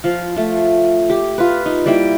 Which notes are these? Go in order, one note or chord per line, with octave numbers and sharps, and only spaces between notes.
F3 F5
A3 F4
G4
F4 B4
D#4
G3 A#3 E4 G5